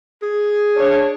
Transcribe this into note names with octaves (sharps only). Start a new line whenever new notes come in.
G#4
D4 C#5